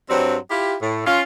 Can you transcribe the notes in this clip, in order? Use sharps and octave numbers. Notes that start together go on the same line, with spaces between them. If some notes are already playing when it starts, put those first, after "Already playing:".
G2 F#3 G3 C4
E4 F4 G4
A2
C#4 F4